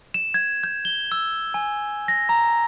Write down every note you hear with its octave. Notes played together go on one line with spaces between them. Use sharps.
E7
G#6
G6
G7
E6
G#5
A#6
A#5